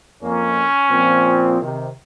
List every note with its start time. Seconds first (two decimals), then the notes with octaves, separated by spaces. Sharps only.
0.23 F2 A#3 C#4
0.90 A#2 F3 C4
1.61 C3 D#3